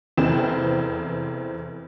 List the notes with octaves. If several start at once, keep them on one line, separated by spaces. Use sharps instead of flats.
F1 E2 E3 C4 C5 E7